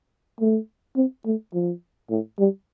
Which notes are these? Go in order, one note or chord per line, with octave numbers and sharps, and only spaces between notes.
A3
C4
A3
F3
A2
G3